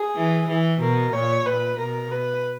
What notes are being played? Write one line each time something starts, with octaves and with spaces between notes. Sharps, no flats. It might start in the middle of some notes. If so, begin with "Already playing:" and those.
Already playing: G#4
E3
E3
B2 A#4
A#2 C#5
A#2 B4
B2 A#4
B4